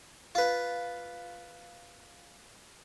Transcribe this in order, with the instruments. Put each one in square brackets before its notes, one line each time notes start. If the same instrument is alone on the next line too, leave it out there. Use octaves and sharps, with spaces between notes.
[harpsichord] F4 B4